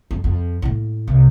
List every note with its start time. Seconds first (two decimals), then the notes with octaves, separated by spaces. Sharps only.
0.11 F2
0.24 F2
0.62 A2 A#3
1.07 C2